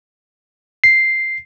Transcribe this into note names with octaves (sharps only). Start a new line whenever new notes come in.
C7